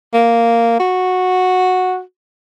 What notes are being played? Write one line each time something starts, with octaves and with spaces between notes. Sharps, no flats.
A#3
F#4